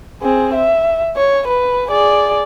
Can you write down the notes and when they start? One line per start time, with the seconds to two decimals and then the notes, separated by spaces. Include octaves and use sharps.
0.22 C4 G#4
0.54 E5
1.16 C#5
1.48 B4
1.89 G#4 D5